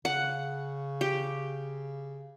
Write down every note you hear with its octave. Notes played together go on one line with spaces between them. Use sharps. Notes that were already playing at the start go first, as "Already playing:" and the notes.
C#3 F#5
G4